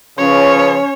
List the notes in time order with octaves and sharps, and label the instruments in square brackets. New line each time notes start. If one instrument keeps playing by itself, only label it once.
[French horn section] C#3 F3 B4 [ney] C#4 [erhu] C#5